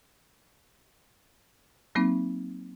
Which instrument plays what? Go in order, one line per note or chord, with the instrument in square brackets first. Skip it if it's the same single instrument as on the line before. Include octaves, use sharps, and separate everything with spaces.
[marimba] F#3 A#3 C4 D#4